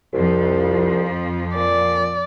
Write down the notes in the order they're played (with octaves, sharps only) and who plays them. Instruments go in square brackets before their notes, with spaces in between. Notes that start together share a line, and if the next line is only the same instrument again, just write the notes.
[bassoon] C2 [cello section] F2 F3
[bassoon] A#2 [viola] D5